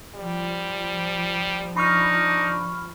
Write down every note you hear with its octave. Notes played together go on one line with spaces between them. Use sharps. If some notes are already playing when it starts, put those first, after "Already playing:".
F3 G3
D4 D#4 B5 C#6 F6